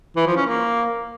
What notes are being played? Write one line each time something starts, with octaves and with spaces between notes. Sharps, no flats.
E3
F3
C#4
A#3